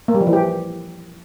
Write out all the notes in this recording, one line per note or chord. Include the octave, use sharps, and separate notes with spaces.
A#3
G3
F3
E3
G4